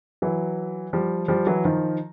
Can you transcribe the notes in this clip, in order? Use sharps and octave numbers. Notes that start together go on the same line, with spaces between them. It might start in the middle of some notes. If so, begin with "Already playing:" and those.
E3 F#3
F3 G3
F3 G3
E3 F#3
D#3 F3